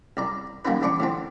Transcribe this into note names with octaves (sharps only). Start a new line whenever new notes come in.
C2 D5 A#5
G3 A#3 B3 C#4 D#4 B4
A1 D4 D5 C#6 D6
A2 D3 C4